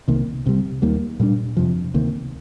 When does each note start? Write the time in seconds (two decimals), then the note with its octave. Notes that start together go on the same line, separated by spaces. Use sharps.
0.08 C2 C3 D#3 A#3
0.46 C2 C3 G3
0.82 D#2 D#3 G3 A#3
1.19 A#2 G3 D4
1.57 F2 C3 F3
1.94 D2 C3 D#3 A#3